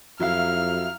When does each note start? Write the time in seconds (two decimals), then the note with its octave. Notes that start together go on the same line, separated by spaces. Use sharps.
0.20 F2 F#3 E4 F5 F6